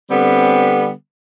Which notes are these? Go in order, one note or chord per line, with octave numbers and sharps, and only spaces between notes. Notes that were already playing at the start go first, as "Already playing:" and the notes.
D3 G3 B3 C4